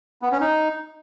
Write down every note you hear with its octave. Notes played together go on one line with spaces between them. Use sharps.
B3
C#4
D#4